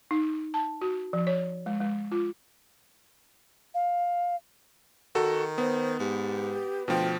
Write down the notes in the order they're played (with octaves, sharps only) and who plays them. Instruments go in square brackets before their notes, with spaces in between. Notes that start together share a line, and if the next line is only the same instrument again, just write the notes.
[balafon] D#4
A5
F#4
F3
C#5
G#3
G#3
F4
[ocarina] F5
[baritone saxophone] D#3 [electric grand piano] F#4 A4
[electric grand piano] B3 [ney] C5
[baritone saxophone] G#2 [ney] G4
[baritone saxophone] D2 [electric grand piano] B2 F3 [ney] G5